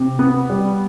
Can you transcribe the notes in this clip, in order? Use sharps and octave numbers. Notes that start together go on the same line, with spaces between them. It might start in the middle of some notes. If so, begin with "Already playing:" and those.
Already playing: C3
B3
G3